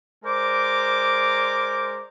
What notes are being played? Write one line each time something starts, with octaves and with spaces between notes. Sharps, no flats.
G#3 A#4 C5 D5 D6